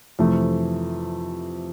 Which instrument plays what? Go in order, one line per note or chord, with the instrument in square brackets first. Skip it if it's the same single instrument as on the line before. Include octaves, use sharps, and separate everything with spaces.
[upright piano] F2 C3 E3 A3